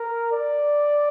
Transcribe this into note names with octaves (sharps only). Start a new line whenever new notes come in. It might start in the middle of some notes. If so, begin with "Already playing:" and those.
Already playing: A#4
D5